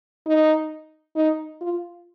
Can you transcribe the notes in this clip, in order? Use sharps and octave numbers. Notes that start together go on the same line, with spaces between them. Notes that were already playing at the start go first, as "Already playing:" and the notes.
D#4
D#4
F4